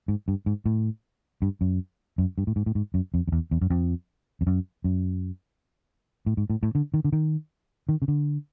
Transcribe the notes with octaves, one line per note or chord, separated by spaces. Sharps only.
G#2
G2
G#2
A2
G2
F#2
F#2
G2
A2
G#2
A2
G#2
F#2
F2
F2
E2
E2
F#2
F2
F2
F#2
F#2
A2
G#2
A2
A2
D3
D#3
D3
D#3
D#3
C#3
D3